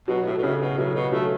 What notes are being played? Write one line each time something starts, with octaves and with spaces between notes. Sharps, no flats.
B2 F#3
A2
B2
A2 C#3
B2
A2 F#3
B2
F#3 A3